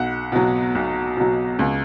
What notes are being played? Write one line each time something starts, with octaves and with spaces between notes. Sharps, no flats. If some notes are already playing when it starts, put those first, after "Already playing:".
Already playing: B1 F#5
B2 F#3
B1
B2 F#3
C#2